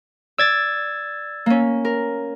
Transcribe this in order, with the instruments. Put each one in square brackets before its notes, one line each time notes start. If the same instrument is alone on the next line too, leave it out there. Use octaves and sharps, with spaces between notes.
[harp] D5 [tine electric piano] E6 G#6 A6
[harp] A#3 C#4
A#4